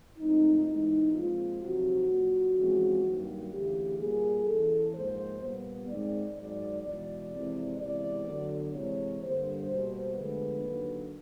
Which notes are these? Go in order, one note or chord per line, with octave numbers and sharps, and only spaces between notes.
G#2 F3 A3 C4 D#4
G#2 E3 G#3 B3 D#4
A#2 F3 G#3 C4 F4
F2 C3 D#3 F#3 F#4
A#2 F#3 A#3
E2 C#3 F3 G#3 C4
G2 D#3 F#3 A#3
D2 C#3 E3 G4
A#2 G3 A#3 G#4
E2 C#3 E3 A4
G#2 F3 A#3 C5
A#2 G3 B3
G#2 D#3 G#3 C4 D5
G#2 D#3 F#3 D5
E2 B2 G#3 D5
F2 C3 E3 G#3 C4
C3 E3 G#3 B3 D5
D2 D3 F#3 B3
C3 E3 G#3 C4 C#5
G2 D3 G3 A#3 C5
B2 G3 A#3
D2 D3 F3 G#3 B3 B4
D#2 D3 F#3 A#3